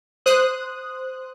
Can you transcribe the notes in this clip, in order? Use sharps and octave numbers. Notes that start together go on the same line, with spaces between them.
C5 D#6 F#6